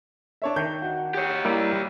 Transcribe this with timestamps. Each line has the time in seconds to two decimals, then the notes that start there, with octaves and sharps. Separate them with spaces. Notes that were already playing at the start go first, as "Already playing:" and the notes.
0.42 D4 C#5 E5
0.56 D#3 G6
0.82 F#4
1.14 G4 C#5
1.45 G3 A#3 E4